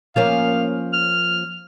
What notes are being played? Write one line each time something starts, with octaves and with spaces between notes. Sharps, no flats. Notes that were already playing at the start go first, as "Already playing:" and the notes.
F3 A#3 C#4 F5
F6